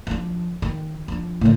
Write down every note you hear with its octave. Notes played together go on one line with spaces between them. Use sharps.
F3 D4
D#3
F3 D4
A2 D3